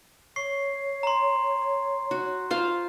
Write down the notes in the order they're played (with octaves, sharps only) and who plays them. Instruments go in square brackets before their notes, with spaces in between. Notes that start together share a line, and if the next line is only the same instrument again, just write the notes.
[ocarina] C#5 [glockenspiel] C#6 C7
[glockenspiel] A#5 C6
[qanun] F#4
F4 C5 F5